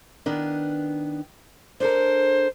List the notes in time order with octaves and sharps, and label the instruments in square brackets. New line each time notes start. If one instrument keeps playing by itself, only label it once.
[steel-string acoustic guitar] D#3 B3 D4
[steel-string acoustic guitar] D4 A4 A#4 [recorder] C5